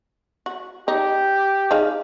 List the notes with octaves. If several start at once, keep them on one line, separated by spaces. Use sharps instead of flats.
F#4
D#4 G4
D#4 G#4 F5